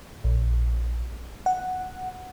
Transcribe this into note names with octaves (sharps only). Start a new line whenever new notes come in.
A#1
F#5